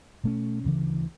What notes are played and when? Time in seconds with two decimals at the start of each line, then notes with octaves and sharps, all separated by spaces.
0.24 B2 A3 C#4
0.64 D2 C#3 E3